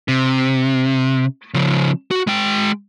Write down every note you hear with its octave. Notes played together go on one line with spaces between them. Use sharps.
C3
C#3 F3
F#4
G#3 G5